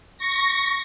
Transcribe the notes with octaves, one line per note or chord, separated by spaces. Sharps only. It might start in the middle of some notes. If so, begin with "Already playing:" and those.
C#6 A#6